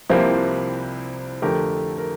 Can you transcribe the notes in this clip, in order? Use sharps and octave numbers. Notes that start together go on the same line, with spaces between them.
C2 C3 F3 A#3 C4 E4
F2 D3 A3 G4 A#4
A#4